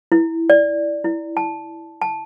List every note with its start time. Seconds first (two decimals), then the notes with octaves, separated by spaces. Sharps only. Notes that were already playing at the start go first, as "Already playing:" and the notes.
0.12 E4
0.50 D5
1.04 E4
1.37 A5
2.02 A5